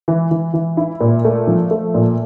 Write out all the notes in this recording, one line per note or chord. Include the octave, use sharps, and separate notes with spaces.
E3
E3
E3
E4
A#2
A3
F3
A3
A#2